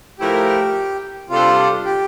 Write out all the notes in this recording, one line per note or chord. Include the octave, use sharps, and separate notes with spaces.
A2 F3 A3 E4 G4 A#4
C3 G3 D4 F4 A4 C5
G4